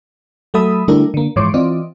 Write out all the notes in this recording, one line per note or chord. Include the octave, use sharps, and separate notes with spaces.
F#3 A3 A4 E5 B5 D#6
D3 G3 A3 D4 E4 A#4
D3 A#3
G#2 E3 F3 C#5 C6 D6
E3 C4 F4 D5 D#5